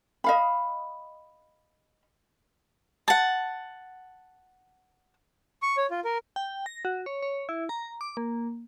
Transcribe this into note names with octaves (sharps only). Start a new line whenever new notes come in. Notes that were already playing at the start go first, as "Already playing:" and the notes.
D#5 F5 B5
F#5 A5
C#6
C#5
F4
A#4
G5
A#6
F#4
C#5
C#5
E4
A#5
D6
A#3